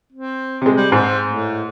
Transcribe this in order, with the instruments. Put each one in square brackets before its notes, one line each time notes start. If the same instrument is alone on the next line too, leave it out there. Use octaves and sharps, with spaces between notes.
[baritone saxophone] C4
[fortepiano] C3 G#3
[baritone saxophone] G3
[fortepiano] G#2 [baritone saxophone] C4
[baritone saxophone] A2